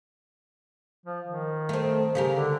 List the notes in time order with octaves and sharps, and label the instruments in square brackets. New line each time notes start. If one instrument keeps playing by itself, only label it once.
[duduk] F3
D#3
[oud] A3 C4
C#3 G4 A#4
[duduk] D3